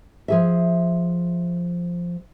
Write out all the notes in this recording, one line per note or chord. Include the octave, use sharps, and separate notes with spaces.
F3 G#4 E5